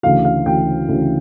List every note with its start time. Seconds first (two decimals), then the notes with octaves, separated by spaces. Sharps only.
0.03 D2 C#3 E3 F5
0.25 F5
0.46 D2 C#3 E3 G5
0.88 D2 C#3 E3